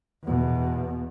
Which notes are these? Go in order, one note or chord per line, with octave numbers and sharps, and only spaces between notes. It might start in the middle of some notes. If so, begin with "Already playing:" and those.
E2 B2